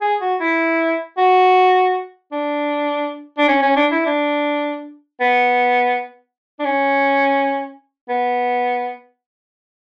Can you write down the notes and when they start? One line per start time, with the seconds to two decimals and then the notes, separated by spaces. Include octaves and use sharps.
0.02 G#4
0.21 F#4
0.40 E4
1.18 F#4
2.32 D4
3.38 D4
3.48 C#4
3.62 C#4
3.76 D4
3.92 E4
4.06 D4
5.21 B3
6.60 D4
6.65 C#4
8.09 B3